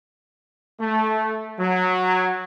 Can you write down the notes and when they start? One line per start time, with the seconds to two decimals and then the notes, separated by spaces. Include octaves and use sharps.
0.80 A3
1.59 F#3